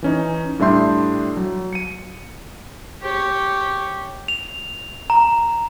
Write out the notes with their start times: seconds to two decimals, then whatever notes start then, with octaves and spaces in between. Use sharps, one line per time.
0.02 E3 C#4 D#4
0.59 A2 G3 D4 E5 C6 G6
1.37 F#3
1.73 C#7 D#7
3.02 G4 C#5
4.28 F7
5.10 A#5